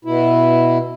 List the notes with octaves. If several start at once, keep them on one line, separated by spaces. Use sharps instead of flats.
B2 E4